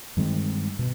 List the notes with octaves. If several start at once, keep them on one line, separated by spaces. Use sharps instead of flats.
G2 D#3 G#3 C4
B2